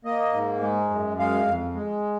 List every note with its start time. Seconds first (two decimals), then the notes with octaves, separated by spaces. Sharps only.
0.05 A#3 D#5
0.33 G#2
0.61 G#3
0.90 F#2
1.19 G#3 F5
1.47 F2
1.75 G#3